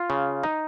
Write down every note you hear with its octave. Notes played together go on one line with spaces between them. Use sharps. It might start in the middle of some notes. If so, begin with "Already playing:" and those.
Already playing: F4
C#3
D#4